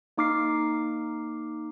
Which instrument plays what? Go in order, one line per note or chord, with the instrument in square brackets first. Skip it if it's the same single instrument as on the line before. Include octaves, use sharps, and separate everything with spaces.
[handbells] A#3 D#4 D6 F6 C7